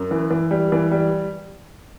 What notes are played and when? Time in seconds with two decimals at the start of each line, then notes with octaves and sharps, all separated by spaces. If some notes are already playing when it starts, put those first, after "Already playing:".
Already playing: F#2
0.11 E3
0.31 E3
0.51 G3
0.72 E3
0.91 G3